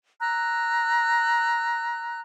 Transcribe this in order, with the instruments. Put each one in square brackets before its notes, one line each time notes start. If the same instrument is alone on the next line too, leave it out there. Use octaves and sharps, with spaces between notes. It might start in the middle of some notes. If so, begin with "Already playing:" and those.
[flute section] A#5 E6 F#6